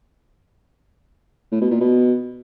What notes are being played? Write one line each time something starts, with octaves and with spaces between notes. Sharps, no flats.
A2
B2
A#2
B2